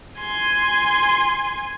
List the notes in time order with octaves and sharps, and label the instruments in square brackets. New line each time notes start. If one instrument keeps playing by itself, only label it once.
[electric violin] G#5 C6